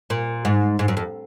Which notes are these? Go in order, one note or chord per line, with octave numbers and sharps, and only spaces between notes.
A#2
G#2
G#2
F#2
F2